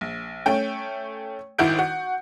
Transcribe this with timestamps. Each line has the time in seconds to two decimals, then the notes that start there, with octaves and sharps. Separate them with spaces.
0.01 A#1
0.46 A3 C#4 G5
1.58 G#1 D#3 E4 F#4 G6 D7
1.79 F#4